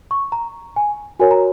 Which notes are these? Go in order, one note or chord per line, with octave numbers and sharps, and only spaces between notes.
C#6
A#5
G#5
F#4 A#4 C#5 G#5
A#5